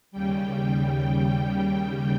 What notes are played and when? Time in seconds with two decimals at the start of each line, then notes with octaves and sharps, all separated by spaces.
0.11 D#2 C#3 G3 G5
1.00 G5